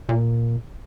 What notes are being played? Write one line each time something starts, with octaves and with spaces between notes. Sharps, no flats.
A#2